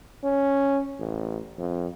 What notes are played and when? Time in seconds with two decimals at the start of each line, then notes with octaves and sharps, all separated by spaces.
0.24 C#4
0.99 A1
1.58 F2